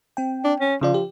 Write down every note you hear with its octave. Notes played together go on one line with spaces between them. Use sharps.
C4 G5
D4
C#4
C#3 F3 F4 D5
G4